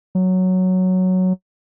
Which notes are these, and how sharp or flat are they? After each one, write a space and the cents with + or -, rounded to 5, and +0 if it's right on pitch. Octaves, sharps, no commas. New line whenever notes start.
F#3 +0